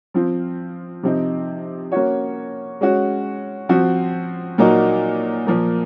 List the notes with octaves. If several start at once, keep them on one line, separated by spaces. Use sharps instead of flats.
F3 C4 F4
C3 F3 C4 D#4
A#3 C#4 F#4 C#5
G#3 C#4 F#4
F3 C4 F#4
A#2 F#3 A#3 D#4 F#4
A#2 F3 A#3